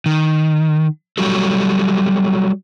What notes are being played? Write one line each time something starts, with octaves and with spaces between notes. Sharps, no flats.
D#3
F#3 G3 F#4 G4 A4